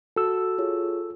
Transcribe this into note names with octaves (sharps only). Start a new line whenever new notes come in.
F#4 A4 E6
F4 G#4 C#5